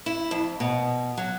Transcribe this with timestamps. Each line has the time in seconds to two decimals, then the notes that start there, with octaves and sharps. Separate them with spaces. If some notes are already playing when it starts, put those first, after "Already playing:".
0.06 E4
0.31 F2
0.60 B2
1.17 F#3